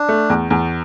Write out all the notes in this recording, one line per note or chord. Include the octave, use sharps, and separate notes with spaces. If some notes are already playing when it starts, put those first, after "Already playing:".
Already playing: D4
A3
E2
E2